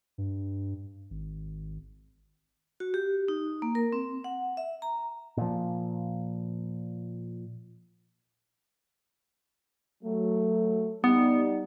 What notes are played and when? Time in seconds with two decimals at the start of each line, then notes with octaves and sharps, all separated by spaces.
0.18 G2
1.10 G#1
2.80 F#4
2.94 G4
3.28 D#4
3.62 A#3
3.75 A#4
3.93 C4
4.24 F#5
4.57 E5
4.82 A#5
5.37 A#2 F3
10.03 F#3 A3
11.04 G3 B3 D#4